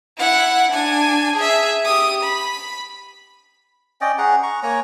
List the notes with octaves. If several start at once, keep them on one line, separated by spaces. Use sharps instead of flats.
E4 F#5
D4 G#5
G#4 E5
G4 D#6
B5
C#4 D5 D#5 G5
C#4 G#4 F#5 A#5
A#5 C#6
A#3 C#5 G#5 A#5